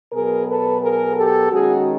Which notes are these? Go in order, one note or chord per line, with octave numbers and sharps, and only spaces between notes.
B2 F#3 B3 G#4 A#4
A4 B4
G#4 A#4
G4 A4
D#3 G#3 C#4 F#4 G#4